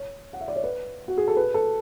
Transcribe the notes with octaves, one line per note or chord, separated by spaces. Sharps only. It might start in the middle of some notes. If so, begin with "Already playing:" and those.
Already playing: C#5
F#5
E5
D5
C#5
B4
F#4
G#4
A4
B4
A4